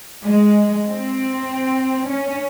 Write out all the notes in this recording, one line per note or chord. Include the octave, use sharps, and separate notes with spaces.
G#3
C4
C#4